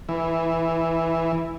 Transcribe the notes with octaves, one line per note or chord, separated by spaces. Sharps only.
E3